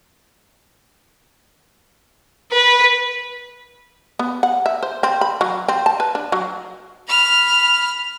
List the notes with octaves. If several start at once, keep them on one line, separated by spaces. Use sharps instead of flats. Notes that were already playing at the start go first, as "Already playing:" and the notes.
B4
B3
F#5
E5
C5
C4
B5
F#3
C4
A5
B4
D4
F#3
B5 F6